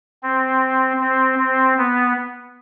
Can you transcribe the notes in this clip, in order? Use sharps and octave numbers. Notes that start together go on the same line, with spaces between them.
C4
C4
C4
B3